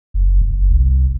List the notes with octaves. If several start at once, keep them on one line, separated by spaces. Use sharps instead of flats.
F#1
F#1
C2